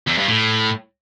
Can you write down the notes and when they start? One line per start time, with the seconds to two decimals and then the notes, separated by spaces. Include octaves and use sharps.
0.07 E2
0.18 G2
0.28 A2